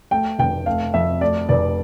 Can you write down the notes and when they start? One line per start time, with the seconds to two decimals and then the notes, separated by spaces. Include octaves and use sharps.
0.11 A3 G5
0.39 F1 G5
0.66 A3 F5
0.94 F2 E5
1.21 A3 D5
1.49 F1 D5